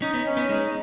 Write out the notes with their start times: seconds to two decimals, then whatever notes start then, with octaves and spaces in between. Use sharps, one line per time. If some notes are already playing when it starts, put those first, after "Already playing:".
0.01 C#4 D#4
0.14 B3
0.25 C#4
0.37 B3
0.49 G#3 D#4